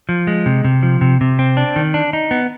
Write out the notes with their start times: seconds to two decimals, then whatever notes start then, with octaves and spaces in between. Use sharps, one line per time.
0.09 F3
0.27 G#3
0.46 C3
0.64 C3
0.83 F3
1.01 C3
1.21 C3
1.39 C4
1.57 D4
1.76 D#3
1.94 D4
2.13 D#4
2.31 B3